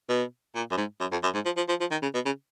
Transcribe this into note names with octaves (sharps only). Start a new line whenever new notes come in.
B2
A#2
F#2
G#2
F#2
F2
F#2
G#2
F3
F3
F3
F3
D#3
C#3
B2
C#3